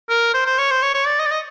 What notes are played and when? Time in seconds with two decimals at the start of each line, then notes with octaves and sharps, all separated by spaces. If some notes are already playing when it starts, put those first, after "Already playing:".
0.09 A#4
0.34 C5
0.46 C5
0.58 C#5
0.71 C5
0.82 C#5
0.94 C#5
1.06 D5
1.19 D#5
1.26 D5
1.31 D#5